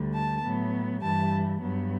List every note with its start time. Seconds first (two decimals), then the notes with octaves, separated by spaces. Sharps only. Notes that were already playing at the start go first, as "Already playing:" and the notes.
Already playing: D2 D3 G3
0.14 A5
0.43 A2 F#3 B3
1.02 G2 E3 G3 A5
1.62 G2 F#3 B3